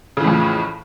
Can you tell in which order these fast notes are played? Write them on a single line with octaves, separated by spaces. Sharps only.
C#3 E3 A2 F2